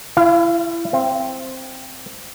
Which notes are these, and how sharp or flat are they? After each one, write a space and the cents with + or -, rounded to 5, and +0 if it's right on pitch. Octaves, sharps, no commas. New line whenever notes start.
E4 +30 F5 -30
C4 +0 F5 -45